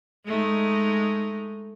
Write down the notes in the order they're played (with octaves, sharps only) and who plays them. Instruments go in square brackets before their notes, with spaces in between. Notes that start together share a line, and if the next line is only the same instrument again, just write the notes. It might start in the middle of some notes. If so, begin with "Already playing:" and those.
[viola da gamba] G#3 A3 D#4